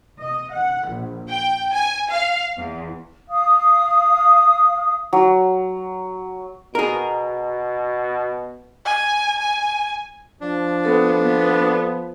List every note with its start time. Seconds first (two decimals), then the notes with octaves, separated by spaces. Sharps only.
0.18 D#5
0.52 F#5
0.89 A#1
1.29 G5
1.73 G#5
2.11 F5
2.57 E2
3.28 F5 D#6
5.13 F#3
6.75 B2 G#4 A#4
8.85 G#5
9.40 G#5
10.41 F3 D4
10.85 B3 A4
11.21 B3